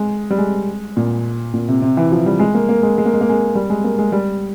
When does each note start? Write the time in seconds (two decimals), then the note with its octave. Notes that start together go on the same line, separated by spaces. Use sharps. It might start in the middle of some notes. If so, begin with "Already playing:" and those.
Already playing: G#3
0.30 G3
0.38 G#3
0.97 A#2
1.54 A#2
1.68 C3
1.82 C3
1.97 E3
2.12 F3
2.26 G3
2.40 G#3
2.55 A#3
2.69 A#3
2.83 G#3
2.98 G#3
3.06 A#3
3.13 G#3
3.21 A#3
3.29 G#3
3.55 G3
3.70 G#3
3.84 A#3
3.99 G#3
4.12 G3